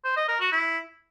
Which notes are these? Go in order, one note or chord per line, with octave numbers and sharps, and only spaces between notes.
C5
D#5
A#4
F#4
E4